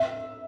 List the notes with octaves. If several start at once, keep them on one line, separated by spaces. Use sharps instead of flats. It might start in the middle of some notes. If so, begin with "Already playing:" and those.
Already playing: E5